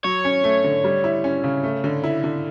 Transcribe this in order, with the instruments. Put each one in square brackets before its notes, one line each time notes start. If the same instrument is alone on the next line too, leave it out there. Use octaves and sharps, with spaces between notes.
[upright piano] F#3 [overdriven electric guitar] C#5
[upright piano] C#4
A3
D3
G3
E4
C#4
C#3
A3
D3
E4
D3